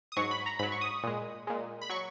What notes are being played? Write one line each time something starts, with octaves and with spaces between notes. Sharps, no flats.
D#6
G#2 F#3 C#6
B5
A#5
G#2 F#3 B5
C#6
D#6
A#2 G#3
A#2 G#3
B5
F#3 C#6